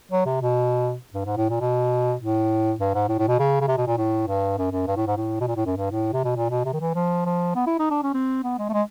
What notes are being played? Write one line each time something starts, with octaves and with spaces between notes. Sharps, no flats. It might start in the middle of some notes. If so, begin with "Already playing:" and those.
F#3
C3
B2
G2
G#2
A2
A#2
B2
A2
G2
G#2
A2
A2
B2
C#3
C#3
C3
B2
A#2
A2
G2
F#2
F#2
G2
A2
G#2
A2
B2
A#2
A2
F#2
G2
A2
C3
B2
A#2
B2
C3
D#3
E3
F3
F3
B3
E4
D#4
D4
C#4
C4
B3
G#3
A3
G#3